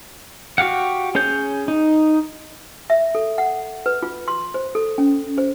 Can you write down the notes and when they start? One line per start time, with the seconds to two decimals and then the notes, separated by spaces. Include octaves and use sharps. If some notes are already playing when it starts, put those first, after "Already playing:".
0.58 F#4 G4 F5 F#5
1.15 C#4 G#4 C#5 G6
1.68 D#4
2.90 E5
3.15 A4
3.38 F#5
3.86 B4
4.03 F4
4.28 C6
4.54 C5
4.75 A4
4.98 C#4
5.38 C5